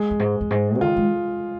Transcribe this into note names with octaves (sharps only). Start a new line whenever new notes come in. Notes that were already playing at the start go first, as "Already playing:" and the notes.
Already playing: G#3
F2
G#2
F2
G#2
D#3 F4
G#3